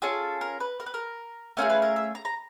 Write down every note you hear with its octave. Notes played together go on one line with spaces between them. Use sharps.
C#4 F4 G#4 A4
A#4
B4
A#4
B4
A#4
A3 C#4 F4 G#4 A#4
B4
A#4
E5
A#5
A#5